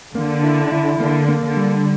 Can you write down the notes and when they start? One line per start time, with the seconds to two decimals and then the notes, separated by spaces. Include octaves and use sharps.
0.15 D3 A#3
0.43 E4
0.72 E4
1.00 D3 A#3
1.28 A#3
1.43 D3
1.57 G3